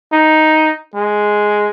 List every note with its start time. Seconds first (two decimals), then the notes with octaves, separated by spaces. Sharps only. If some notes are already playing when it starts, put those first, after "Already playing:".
0.13 D#4
0.96 G#3